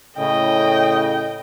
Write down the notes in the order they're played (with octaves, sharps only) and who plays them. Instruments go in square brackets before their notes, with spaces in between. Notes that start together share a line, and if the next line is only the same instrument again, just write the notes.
[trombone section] A2 C#3 [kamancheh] D#5 G5